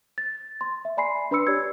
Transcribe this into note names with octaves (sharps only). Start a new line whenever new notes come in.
A6
C6
E5
D5 G#5 B5 C6 C7
D4 B4 B5 C6 E6 C#7
G4 C#5 D5 E6 G#6